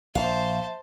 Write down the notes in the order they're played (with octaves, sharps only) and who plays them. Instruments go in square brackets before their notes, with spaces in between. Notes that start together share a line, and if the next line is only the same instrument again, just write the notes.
[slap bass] A#1 [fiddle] C5 A5 [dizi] E5 [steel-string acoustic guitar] F5